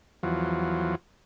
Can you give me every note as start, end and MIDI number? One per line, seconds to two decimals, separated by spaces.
0.23 0.95 40
0.23 0.95 53
0.23 0.95 54